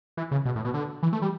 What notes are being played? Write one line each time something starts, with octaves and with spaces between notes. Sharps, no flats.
E3
C#3
B2
A2
B2
D3
E3
A3
G3